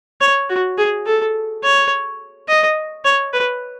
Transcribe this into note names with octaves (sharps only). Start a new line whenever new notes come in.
C#5
F#4
G#4
A4
C#5
D#5
C#5
B4